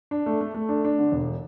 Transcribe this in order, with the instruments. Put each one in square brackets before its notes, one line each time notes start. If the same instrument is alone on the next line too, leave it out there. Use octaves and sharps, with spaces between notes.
[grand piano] D4
A3
A3
A3
D4
D4
D3
E1